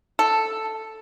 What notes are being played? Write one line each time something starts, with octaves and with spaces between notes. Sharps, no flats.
A4